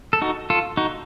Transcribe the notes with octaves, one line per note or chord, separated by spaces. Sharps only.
A4
D#4 F#4
F4 A4
D#4 F#4